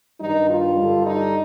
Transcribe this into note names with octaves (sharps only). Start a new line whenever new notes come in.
G2 D#3 G3 D#4
F4
G2 D3 G3
D#4